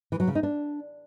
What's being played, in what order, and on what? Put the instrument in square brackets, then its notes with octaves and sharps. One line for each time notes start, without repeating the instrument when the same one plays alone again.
[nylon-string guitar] E3
F#3
C#3
D#4
D4